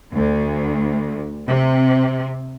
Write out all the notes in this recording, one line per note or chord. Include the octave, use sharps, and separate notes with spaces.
D2
C3